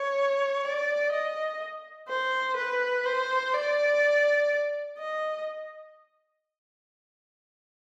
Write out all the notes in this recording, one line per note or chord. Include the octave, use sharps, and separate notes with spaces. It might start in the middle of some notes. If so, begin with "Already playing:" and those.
Already playing: C#5
D5
D#5
C5
B4
C5
D5
D#5